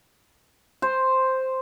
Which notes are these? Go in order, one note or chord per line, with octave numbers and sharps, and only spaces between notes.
C5